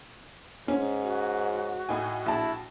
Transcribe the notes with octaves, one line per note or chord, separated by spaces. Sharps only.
G#2 C#4
F#4
A2 D#4 G#5
A#1 E4 A5